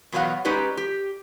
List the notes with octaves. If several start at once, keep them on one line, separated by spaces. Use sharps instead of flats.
E2 B2 F#3 B3 F5 F#5
G#3 C#4 D#4 G4 B4 D5
G4